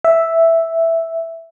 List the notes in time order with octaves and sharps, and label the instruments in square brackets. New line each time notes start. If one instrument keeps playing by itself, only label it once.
[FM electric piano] E5